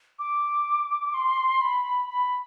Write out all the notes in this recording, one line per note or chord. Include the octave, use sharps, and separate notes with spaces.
D6
C6
B5
B5